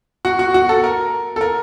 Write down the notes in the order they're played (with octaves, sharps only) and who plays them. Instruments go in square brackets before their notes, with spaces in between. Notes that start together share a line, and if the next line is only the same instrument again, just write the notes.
[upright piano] F#4
F#4
F#4
A4
A#4
A4
A#4